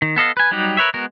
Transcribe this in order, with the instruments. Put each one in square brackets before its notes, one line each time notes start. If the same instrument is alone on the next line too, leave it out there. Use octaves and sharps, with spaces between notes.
[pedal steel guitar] D#3
B3 A4 D#5 F5
B4 G#5
F#3 G3 D#4 F#4 G4
A#4 B4 C#5 E5
G#3 B3 F#4 A#4